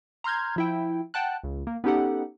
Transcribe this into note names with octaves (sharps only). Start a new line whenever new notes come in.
A#5 C6 F6 G6 G#6
F3 E4 G5
F#5 G5 A5 F#6
C#2
A#3
B3 C#4 D#4 G4 A4 F#5